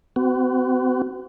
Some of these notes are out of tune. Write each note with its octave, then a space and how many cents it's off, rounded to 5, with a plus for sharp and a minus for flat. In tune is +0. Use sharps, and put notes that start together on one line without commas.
C4 -45 F#4 +20